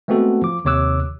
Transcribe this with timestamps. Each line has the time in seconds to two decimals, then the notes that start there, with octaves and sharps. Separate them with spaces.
0.08 G#3 A3 B3 C4 F#4 A4
0.42 F3 D6
0.65 D#2 C3 C#5 D6 E6 F#6